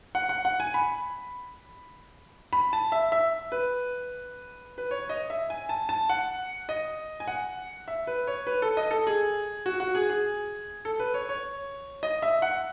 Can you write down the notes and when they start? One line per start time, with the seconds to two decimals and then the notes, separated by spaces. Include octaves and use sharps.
0.15 F#5
0.29 F#5
0.45 F#5
0.60 G#5
0.74 B5
2.53 B5
2.73 A5
2.92 E5
3.12 E5
3.52 B4
4.78 B4
4.91 C#5
5.09 D#5
5.30 E5
5.50 G#5
5.69 A5
5.89 A5
6.10 F#5
6.69 D#5
7.20 G#5
7.28 F#5
7.88 E5
8.07 B4
8.27 C#5
8.47 B4
8.62 A4
8.77 D#5
8.91 A4
9.07 G#4
9.66 F#4
9.80 F#4
9.95 G#4
10.10 G#4
10.85 A4
11.00 B4
11.14 C#5
11.29 C#5
12.03 D#5
12.22 E5
12.42 F#5